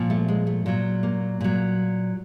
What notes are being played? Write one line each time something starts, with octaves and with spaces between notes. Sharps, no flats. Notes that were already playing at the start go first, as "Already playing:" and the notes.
Already playing: A#2 F3
A3
G#3
A3
A#2 F#3
A#3
A#2 F#3